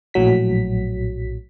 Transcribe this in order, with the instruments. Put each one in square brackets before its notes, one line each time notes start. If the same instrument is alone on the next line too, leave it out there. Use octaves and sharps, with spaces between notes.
[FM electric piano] A#1 A2 F#3 B6